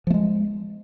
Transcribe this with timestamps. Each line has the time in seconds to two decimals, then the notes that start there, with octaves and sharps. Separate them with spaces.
0.07 F3
0.10 A3
0.14 G#3